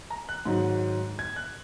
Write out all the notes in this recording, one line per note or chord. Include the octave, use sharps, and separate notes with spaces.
A#5
F#6
G#2 D#3 F#3
G#6
F#6